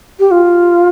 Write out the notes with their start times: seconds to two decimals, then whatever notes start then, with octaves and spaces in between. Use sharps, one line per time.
0.20 G4
0.31 F4